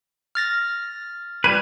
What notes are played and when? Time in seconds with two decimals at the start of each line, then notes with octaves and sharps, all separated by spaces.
0.35 F6 A6 A#6
1.44 G3 B4 G#6 D#7